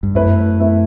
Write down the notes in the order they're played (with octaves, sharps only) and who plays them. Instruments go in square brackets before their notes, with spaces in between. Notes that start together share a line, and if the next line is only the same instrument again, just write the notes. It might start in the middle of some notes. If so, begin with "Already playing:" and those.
[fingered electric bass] G2
[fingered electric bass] F#2 [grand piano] A3 E4 B4
[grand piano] A3 E4 B4